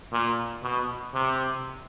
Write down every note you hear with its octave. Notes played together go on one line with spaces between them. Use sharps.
A#2
B2
C3